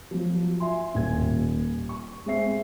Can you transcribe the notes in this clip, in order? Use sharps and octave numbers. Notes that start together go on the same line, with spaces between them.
F3 F#3
E5 G#5 C6
D#1 D#2 G#5 G#6
C#6
G#3 C4 E5 C7